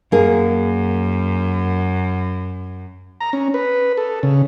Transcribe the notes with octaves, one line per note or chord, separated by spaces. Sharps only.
F#2 A#3 G#4
A#5
C#4
B4
A4
C#3